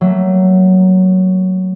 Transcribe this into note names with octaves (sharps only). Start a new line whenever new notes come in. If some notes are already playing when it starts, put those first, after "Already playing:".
F#3 A3 A#3